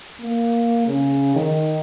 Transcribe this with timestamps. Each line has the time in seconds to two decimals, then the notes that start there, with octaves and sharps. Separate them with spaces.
0.20 A#3
0.87 C#3
1.36 D#3